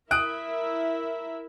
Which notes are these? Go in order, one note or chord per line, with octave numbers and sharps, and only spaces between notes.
E4 A#4 E5 D#6 F#6 D7